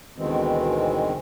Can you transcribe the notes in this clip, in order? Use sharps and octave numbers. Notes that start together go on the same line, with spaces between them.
D2 B2 D#3 E3 G#3 C4